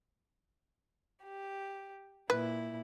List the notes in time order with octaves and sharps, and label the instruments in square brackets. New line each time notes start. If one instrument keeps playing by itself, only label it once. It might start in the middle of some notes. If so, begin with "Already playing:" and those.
[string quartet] G4
[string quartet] A#2 E4 [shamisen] B4